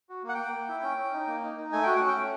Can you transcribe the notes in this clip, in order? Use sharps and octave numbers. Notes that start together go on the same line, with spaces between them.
F#4
A#3
F#5
A#3 G5
A#3
E4
C#4
C#4
D#4
A#3
D#4
D#4
A3 G#5
F#4 G5
F#5
C#4
G5
A3